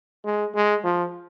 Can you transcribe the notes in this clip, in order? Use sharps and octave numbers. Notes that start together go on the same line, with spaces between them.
G#3
G#3
F3